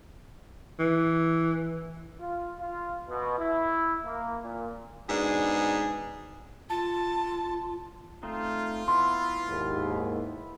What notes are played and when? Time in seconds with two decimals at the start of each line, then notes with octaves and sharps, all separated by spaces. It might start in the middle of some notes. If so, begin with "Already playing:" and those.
0.79 E3
2.19 F4
2.58 F4
3.08 B2
3.38 E4
4.05 A#3
4.42 A#2
5.09 G#2 B2 D4 G#4
6.70 F4 A5
8.23 A3 C4 D#4 F4
8.88 B3 E4 C6
9.47 D#2 G#2